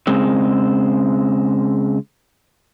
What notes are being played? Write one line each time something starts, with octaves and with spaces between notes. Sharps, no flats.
C#3 G#3 C4